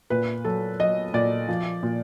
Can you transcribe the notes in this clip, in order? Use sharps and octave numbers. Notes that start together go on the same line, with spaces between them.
A#2 B4
F#3 A4
F#3 D#5
A#2 D5
F3
A#2